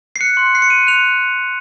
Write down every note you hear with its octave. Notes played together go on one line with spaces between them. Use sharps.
C7
F#6 C#7
C6
F#6 C7
C#7
C6 D#7
F#6 F7